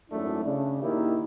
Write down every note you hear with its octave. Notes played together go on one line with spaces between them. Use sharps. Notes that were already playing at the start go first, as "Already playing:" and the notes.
G#1 F#2 A3 D4 E4
C#3 D4
A#2 D#3 A#3 E4 G4